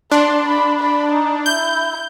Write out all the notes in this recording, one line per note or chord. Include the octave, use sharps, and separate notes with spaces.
D4 C6
B5
B5
D#4
E4 G6